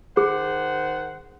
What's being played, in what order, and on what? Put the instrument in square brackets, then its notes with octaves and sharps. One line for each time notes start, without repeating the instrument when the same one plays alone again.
[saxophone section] D#3 C5 F#5 [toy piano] G#4